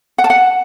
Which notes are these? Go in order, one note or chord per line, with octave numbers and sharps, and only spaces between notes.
F#5
A5
F#5